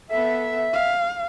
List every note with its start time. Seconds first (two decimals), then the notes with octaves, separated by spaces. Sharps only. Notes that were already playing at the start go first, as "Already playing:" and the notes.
0.10 B3 A4 E5
0.73 F5